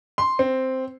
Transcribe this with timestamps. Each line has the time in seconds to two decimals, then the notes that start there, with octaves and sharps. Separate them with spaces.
0.18 C6
0.39 C4